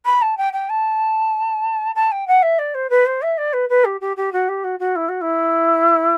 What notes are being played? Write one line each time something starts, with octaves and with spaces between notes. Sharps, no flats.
B5
A5
G5
G5
A5
A5
G5
F#5
E5
D5
C5
B4
C5
E5
D5
B4
B4
G4
G4
G4
F#4
G4
F#4
F#4
E4
F#4
E4